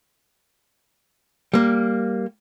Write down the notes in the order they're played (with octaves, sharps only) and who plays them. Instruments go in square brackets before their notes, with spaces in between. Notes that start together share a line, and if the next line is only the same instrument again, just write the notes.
[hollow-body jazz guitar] G3 A#3